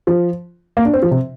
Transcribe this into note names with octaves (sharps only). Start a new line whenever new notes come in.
F3
A#3
D4
C4
F3
C3